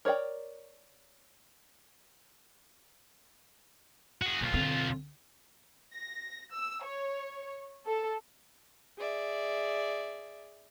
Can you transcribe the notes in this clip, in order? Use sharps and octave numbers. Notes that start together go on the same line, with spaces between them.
A#4 C#5 D5 F#5 G5
F#4 G#4
B1 A#3 F4
D3 C4
A#6
E6
C#5
A4
G#4 D5 E5